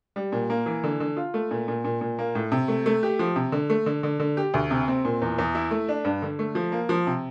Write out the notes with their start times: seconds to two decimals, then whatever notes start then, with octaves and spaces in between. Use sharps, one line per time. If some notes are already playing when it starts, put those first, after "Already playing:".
0.16 G3
0.32 A#2
0.50 A#3
0.66 E3
0.84 D3
1.00 D3
1.17 F4
1.34 A3
1.51 A#2
1.68 A#2
1.84 A#2
2.01 A#2
2.19 A#3
2.35 A2
2.52 C3
2.68 A3
2.86 A3
3.03 G4
3.19 F3
3.36 C3
3.52 D3
3.70 A3
3.86 D3
4.03 D3
4.20 D3
4.37 G4
4.54 D2
4.71 C3
4.88 C4
5.05 A#2
5.22 E2
5.38 E2
5.55 E4
5.71 A3
5.89 D4
6.05 G2
6.22 D3
6.39 A3
6.55 F3
6.72 A#3
6.89 F3
7.07 C3